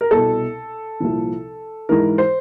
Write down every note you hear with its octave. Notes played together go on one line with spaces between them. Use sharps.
A#4
C2 B2 A4
C2 A#2 F3
G#2 E3 A#4
C5